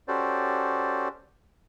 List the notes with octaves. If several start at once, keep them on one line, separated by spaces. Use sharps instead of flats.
C#4 F#4 G4 A4 C5 D5